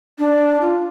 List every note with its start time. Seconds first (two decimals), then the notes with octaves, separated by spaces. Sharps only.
0.19 D4
0.61 F4